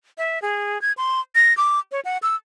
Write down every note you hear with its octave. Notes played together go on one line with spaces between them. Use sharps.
E5
G#4
G#6
C6
A#6
D6
C#5
F#5
E6